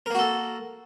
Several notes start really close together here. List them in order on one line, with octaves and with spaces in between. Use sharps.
A#4 A#3 F#4 A4